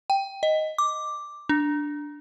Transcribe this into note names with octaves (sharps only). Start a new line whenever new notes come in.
G5
D#5
D6
D4